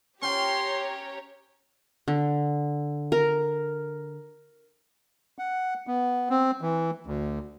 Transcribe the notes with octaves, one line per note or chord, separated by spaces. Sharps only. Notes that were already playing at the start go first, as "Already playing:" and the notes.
C#4 G4 C#5 G5 A#5 C6
D3
A#4
F#5
B3
C4
E3
D2